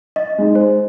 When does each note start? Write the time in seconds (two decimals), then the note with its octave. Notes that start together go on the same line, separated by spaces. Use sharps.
0.16 D#5
0.38 G#3 D#4
0.55 C5